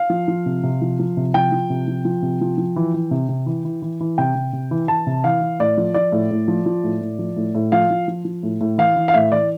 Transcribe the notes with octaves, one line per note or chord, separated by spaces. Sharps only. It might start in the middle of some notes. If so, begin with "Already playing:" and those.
Already playing: F5
F3
F3
C3
C3
F3
F3
C3
F3 G5
F3
C3
F3
F3
C3
F3
F3
E3
E3
C3
C3
E3
E3
E3
E3
C3 G5
C3
C3
E3
E3 A5
C3
E3 F5
E3
A2 D5
F3
F3 D5
A2
A2
F3
F3
A2
A2
F3
A2
A2
F3 F5
F3
F3
F3
A2
A2
E3 F5
E3
F5
A2 E5
E3 D5